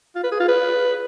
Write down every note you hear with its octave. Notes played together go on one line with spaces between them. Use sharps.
F4
B4
G#4
F4
B4